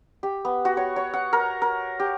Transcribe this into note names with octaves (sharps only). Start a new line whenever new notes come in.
G4
B3
F#4
C#5
C#5
F#5
A#4
A#4
G4